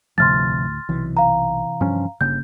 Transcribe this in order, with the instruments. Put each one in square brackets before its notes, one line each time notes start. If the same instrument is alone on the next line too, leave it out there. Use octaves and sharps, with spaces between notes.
[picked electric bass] G1 C3 F3 [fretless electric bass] D2 A2 [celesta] C6 F6 A6
[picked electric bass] B1 [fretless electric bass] C3 E3
[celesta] F5 A#5
[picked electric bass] G2 F3 C#4
[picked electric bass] G1 [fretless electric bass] C#3 A#3 [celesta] G6